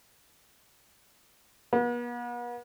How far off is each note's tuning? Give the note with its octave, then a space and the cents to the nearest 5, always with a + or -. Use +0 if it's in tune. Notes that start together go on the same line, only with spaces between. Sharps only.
B3 -40